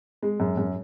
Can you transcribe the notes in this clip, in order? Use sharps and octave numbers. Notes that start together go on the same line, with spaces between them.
G#3
F#2
F#2